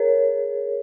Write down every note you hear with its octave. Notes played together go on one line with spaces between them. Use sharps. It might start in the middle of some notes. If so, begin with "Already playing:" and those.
Already playing: G#4 A#4 C#5